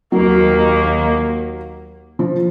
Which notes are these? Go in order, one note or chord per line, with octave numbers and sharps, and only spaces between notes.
D#2 D#3 F#3 A#3
F3